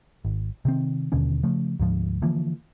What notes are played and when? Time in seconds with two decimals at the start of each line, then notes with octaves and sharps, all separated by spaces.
0.25 G#1
0.65 C3 D#3 C4
1.12 D#2 B2 D3 C#4
1.43 C#3 F3 A3
1.79 D2 G#2 F3
2.22 D3 E3 F3 A#3